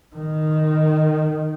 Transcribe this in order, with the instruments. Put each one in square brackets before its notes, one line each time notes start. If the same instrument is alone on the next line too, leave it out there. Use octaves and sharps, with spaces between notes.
[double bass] D#3